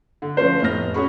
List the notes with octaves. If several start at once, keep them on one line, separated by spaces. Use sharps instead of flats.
D3
F3 A3 C#4 C5
F1 A2 B3 F6 A#6
C#4 F#4 G#4 B5 C#6